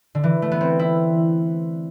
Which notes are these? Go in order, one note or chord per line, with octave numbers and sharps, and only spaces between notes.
D3
E3
A3
B3
C4
E4